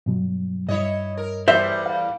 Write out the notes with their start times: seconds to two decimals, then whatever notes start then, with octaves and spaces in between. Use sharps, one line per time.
0.06 G2 B2 F#3
0.68 G2 E4 C#5 D#5
1.17 A#4
1.48 E2 G3 C5 E5
1.86 F5